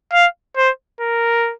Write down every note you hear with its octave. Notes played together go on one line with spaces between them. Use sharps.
F5
C5
A#4